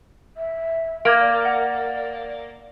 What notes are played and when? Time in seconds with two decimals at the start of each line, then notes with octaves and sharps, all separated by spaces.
0.37 E5
1.05 A#3 D6 G#6 D7
1.20 D5
1.45 F#5